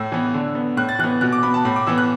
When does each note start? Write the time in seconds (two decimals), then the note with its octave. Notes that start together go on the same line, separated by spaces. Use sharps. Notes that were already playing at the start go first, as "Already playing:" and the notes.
Already playing: A2 E6
0.12 E3 B3
0.34 D3
0.55 B3
0.77 A2 F#6
0.89 A6
0.99 E3 B3 F#6
1.21 B2 F#6
1.32 D6
1.43 B3 B5
1.54 A5
1.65 A2 B5
1.76 D6
1.87 E3 B3 E6
1.98 F#6